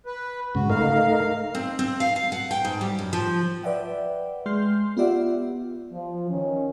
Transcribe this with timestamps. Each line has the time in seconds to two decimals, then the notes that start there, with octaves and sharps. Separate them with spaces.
0.06 B4
0.55 G#2 C#3 F#4
0.70 A3 D#4 A#4 F5
1.55 C4
1.79 C4
2.00 F5
2.16 F5
2.32 F#5
2.51 G5
2.65 G#2
2.81 G3
2.99 F#2
3.13 F3
3.63 B4 D5 E5 F#5 G5
4.46 G#3 C6 F6 G6 C7
4.97 B3 F4 G4 D5 E5 F#5
5.92 F3
6.29 D#3 C#4